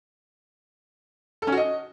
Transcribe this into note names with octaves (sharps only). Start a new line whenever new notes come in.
A4
C#4
F#4
D#5